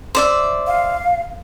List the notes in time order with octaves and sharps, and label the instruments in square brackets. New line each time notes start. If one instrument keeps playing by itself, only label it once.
[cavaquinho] C5 D5 E5
[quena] F5